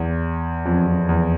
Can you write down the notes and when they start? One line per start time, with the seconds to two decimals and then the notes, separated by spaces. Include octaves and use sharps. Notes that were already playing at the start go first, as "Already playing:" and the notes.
Already playing: E2
0.65 F2
0.87 F2
1.09 E2